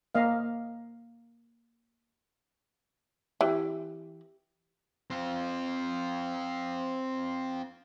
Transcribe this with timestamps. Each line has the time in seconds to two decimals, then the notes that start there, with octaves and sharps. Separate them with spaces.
0.15 A#3 D#5 F5
3.41 E3 G4
5.10 C4 F4